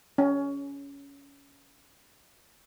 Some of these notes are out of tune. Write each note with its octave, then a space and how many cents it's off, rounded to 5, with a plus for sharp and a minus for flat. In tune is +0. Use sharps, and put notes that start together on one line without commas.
C#4 +20